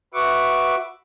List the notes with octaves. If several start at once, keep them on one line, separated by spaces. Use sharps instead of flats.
F#4 B4 E5 F#5 C#6 D6